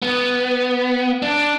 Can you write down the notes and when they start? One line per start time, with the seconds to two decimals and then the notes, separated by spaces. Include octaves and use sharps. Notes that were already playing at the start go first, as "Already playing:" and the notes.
0.02 B3
1.22 D4